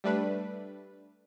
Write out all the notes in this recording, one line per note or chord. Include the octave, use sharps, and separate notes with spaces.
G3 A3 D4 B4